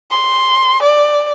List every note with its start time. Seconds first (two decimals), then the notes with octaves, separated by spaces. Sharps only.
0.11 C6
0.83 D5